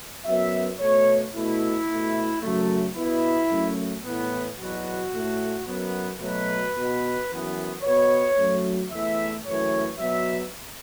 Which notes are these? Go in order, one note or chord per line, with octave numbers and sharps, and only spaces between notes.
F#2 F#3 B3 E5
B2 A3 C#5
B2 A3 E4
B2 A3
F#2 C#3 F#3 A3
B2 B3 E4
F#2 F#3 A3
A2 E3 B3
E2 B2 F#3 B3 F#4
A2 A3
F#2 F#3 B3
B2 F#3 A3 B4
B2 B3
F#2 E3 B3
B2 B3 C#5
F#2 F#3 A3
E2 E3 A3 E5
F#2 E3 A3 C#5
B2 F#3 B3 E5